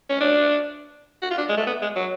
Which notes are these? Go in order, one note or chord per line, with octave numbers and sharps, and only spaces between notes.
C#4
D4
F#4
F4
D4
G#3
A3
B3
G#3
F#3